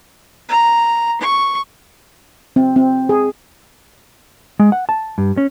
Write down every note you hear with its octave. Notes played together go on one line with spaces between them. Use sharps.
A#5
C#6
C4
C4
G#4
G#3
F#5
A5
G2
C#4